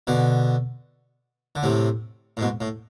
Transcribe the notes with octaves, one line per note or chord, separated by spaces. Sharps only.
B2 D3
D3
A2 C3
A2
G#2 B2
A2